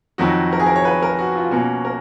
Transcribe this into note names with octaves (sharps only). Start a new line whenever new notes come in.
F2 D#3 F#3 F#4
A#4
G#4
A#4
C#5
B4
A#4
F#4
F4
B2 A#3 C#4 F#4
A#4